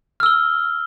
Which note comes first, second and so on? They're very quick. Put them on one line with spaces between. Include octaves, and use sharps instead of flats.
F6 E6 G7